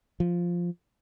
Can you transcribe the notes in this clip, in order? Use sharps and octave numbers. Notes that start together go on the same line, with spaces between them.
F3